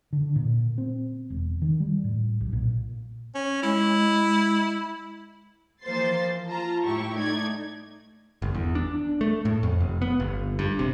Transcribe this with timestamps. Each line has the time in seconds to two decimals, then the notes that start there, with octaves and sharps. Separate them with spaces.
0.13 D3
0.36 A#2
0.78 C4
1.30 E1
1.62 D#3
1.80 G3
2.04 A2
2.40 B1
2.53 A#2
3.35 C#4
3.63 G#3 E4
5.83 E3 F3 A#3 C5 A6 C7
6.47 F4 A5 A#5
6.84 A2 E4 G4 C#6
7.16 A3 D#4 D5 G#6
8.42 G1
8.55 E2
8.75 D4
9.21 A3
9.45 A2
9.63 F2
9.81 F1
10.02 B3
10.20 G1
10.59 G2
10.79 C3